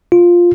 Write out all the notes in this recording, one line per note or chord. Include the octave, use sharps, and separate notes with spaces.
F4